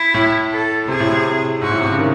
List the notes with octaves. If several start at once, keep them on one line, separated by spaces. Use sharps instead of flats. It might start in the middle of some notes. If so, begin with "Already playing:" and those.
Already playing: E4
A2
A4
C3 G#4
A2
C3
G#2 F#4
A2
C3
C#3
D#3